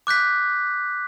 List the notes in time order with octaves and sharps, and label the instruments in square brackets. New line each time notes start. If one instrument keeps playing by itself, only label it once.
[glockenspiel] D6 F#6 G6 B6